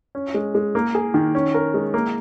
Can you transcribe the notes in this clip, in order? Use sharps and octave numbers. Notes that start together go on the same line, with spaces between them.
C#4
G#3
G#3
A#3
G#4
D#3
C#4
A#4
G#3
A#3